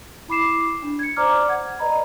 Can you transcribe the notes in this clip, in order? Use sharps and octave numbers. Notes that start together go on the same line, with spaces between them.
E4 B5 D6 C7 E7
D4
G#6 C#7
C5 D5 A#5 D6 F6
F#5 G#6
B4 D5 D#5 A#5 B5